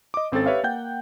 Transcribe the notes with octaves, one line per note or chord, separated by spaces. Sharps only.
D#5 D6
G#1 C4 C#4 A4 A6
G4 B4 C#5 E5 F5
A#3 F#5 G5 G6